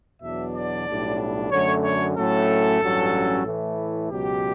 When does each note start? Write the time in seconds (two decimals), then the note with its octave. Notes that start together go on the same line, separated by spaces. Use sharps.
0.22 E2 B2 F#3 B3 D4 E5
0.55 D5
0.87 B1 A2 G3 D4
1.51 F#2 D3 F#3 A3 C#5
1.84 C#5
2.16 A2 F#3 A3 C#4 A4
2.81 A1 G2 F#3 C#4
3.46 A2 E3 A3
4.10 C#2 B2 F#3 G4